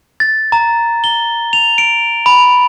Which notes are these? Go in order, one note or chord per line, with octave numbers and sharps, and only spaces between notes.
A6
A#5
G7
F7
D7
B5